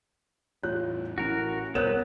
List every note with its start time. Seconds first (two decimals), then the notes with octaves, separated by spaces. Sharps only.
0.63 E2 A2 F4 C#5 F#6
1.18 A1 E3 C#4 F#4 A#4
1.75 B1 G2 B3 A#4 C5 C#5 F#6 E7